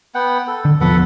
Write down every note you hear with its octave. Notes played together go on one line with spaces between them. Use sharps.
B3 F#5 G5
A4
D3
E1 F3 B3 A4 B4 F#5